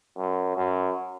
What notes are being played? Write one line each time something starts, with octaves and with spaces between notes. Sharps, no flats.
F#2
F#2